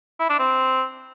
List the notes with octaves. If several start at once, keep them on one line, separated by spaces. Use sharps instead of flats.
E4
D4
C4